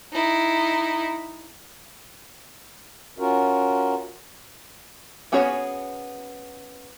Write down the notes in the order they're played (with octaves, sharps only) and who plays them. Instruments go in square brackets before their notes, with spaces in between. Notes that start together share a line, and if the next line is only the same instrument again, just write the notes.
[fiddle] D#4 E4
[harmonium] C#4 F4 F#4 A#4
[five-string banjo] B3 C#4 F#4 G#4 C#5